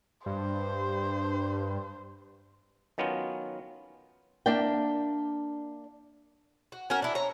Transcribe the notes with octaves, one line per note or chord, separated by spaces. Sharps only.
G2 C5
D#3 F#3 B3 C#4 F4
A#3 D4 D5 E5 G5
F#4
C#4 F#4 A#4
D4 E4
C#5 A#5